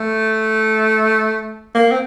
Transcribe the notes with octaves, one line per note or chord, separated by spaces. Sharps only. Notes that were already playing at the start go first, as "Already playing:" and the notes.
Already playing: A3
A#3
C4